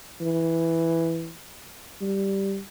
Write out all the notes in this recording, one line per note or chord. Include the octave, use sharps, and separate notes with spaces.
E3
G3